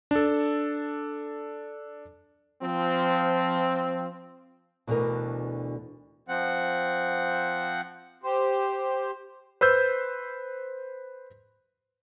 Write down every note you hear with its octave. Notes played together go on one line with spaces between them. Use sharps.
D4 A4
F3 C4
D2 B2 D3 E3 A#4
F3 C4 F#5
G4 C5
B4 C5 E6 G6